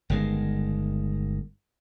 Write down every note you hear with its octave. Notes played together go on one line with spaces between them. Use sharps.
G1 D#3 G#3